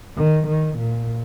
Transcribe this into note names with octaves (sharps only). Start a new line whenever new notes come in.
D#3
D#3
A#2